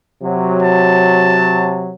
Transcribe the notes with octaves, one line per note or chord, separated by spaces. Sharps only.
C3 F#3
A5